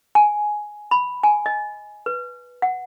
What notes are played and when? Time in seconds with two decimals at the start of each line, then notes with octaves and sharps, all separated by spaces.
0.15 G#5
0.91 B5
1.23 G#5
1.46 D#5
2.06 B4
2.62 F#5